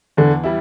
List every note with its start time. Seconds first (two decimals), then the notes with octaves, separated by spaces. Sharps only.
0.17 E2 D3
0.44 G3 E4